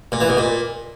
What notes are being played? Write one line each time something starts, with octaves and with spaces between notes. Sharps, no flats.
A#2
E3
B2
A#2